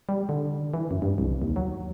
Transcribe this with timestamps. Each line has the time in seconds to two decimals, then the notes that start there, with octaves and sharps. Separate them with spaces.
0.09 G3
0.29 D3
0.74 E3
0.91 F#2
1.02 G2
1.18 C2
1.42 D#2
1.56 F#3